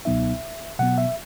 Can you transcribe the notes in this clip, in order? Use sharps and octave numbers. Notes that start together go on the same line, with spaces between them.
C#2 B2 F#3 B3 D#4 E5
B2 F#3 B3 F#5
E5